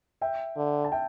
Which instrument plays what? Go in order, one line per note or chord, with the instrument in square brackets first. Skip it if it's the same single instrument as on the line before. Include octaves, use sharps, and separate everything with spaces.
[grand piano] E5 G5
[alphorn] D3
[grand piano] A5
E5 G5